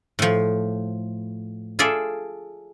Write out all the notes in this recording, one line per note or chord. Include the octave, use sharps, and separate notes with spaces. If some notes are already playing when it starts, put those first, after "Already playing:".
A2 F3
F4 G#4 A4 D5 E5